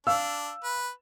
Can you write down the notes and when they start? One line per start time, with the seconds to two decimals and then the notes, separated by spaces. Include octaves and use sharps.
0.07 D4 F5 E6
0.64 B4